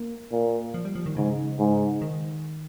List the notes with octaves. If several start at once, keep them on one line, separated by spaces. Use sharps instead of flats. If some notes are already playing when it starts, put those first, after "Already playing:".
Already playing: A#3
A#2
F3
G3
F3
D#3
G#2 C#3
G#2
D#3